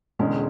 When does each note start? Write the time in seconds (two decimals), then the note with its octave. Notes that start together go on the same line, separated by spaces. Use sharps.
0.19 E1 E2 D3 G#3 C#4